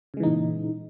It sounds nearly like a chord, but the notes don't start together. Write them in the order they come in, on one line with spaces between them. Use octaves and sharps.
C#3 G#3 E3 D#4 A#2